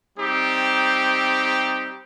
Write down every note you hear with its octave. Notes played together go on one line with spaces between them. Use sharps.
G3 C4 D#4 G4